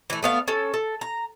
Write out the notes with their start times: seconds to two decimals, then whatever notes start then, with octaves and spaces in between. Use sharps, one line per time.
0.10 E3 A3
0.23 A3 B3 F5
0.48 C#4 A4
0.74 A4
1.01 A#5